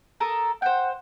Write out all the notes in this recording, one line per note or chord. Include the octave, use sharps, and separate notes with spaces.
A4 A#4 D#6
C5 F#5 G5